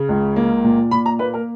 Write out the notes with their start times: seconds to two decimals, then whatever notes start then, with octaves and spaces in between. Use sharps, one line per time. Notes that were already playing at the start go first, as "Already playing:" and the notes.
Already playing: C#3
0.09 C#2
0.36 A#3
0.64 A#2
0.91 A#2 B5
1.06 A#5
1.19 A#3 B4
1.34 A#4